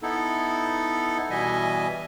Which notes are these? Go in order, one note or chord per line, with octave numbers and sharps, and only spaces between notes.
B3 D#4 E4 A4
B2 E3 G3 D#5 E5 G#5